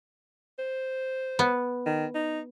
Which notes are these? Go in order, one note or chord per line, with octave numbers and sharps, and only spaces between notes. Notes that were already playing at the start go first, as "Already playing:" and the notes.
C5
B3
D#3
D#4